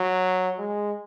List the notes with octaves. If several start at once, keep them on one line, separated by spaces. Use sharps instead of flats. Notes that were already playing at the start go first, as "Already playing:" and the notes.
Already playing: F#3
G#3